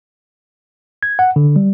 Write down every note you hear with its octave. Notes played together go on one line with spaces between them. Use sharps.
G#6
F#5
D3
G3